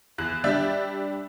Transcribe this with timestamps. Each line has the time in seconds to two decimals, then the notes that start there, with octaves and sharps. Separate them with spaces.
0.18 E2 F#6
0.44 G3 D4 E5 G6 A6